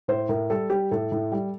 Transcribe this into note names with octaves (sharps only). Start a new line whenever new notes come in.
A2 C5
A2 A#4
G3 A4
G3 G4
A2 A4
A2
G3